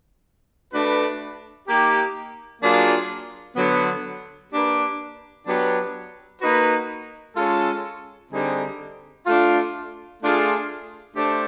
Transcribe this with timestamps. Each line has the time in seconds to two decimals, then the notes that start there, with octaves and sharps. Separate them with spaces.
0.72 A3 D4 F#4 B4
1.67 A#3 D#4 G4
2.62 F#3 A#3 D4 F4 G#4
3.56 D3 F#3 B3
4.52 A#3 D4 G4 B4
5.46 F#3 B3 D4 G4 B4
6.41 A#3 D#4 F#4 B4
7.36 G#3 C#4 F4 A4
8.31 D3 G3 C4 D#4 G#4
9.26 A3 D4 F4
10.21 A3 D4 F4 G#4
11.15 A3 D4 G4 C5